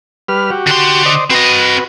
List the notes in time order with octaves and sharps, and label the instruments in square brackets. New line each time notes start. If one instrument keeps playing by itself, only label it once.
[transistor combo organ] G3 B4 F6
F#4 G4
[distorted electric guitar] D3 C6
[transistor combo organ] C5 D5 D#5
[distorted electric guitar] C4 D#5 [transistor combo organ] F#4 B4